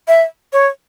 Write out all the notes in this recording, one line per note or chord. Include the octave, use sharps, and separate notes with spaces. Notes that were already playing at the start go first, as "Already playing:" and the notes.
E5
C#5